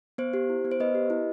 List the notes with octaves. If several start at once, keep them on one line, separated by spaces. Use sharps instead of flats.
B3 C5
G4
E4
B3
C5
B3 B4 D#5
G4
E4